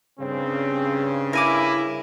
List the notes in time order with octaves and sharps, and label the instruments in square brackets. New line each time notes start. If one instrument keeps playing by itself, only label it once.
[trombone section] G2 C#3 [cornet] C4
[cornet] E4 [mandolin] A#4 G#5 D6